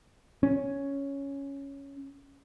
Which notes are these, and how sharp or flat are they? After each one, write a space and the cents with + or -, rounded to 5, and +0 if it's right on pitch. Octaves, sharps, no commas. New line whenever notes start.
C#4 +0